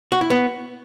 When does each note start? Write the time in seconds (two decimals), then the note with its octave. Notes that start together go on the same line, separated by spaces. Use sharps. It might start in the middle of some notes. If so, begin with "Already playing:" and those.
0.12 F#4
0.21 E4
0.30 B3